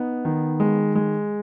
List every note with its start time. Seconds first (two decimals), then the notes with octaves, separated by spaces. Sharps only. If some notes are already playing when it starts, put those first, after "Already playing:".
Already playing: B3 D#4
0.25 D#3
0.60 G#3
0.95 G#3